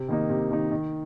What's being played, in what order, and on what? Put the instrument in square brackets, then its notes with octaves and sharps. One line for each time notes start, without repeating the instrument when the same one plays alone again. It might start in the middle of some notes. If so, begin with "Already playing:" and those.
Already playing: [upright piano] C3
D#3 A#3 D#4
C3
D#3 A#3 D#4
D#3